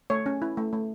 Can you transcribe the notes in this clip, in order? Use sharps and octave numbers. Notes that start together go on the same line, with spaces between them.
A3 C#5
C#4
E4
A3
A3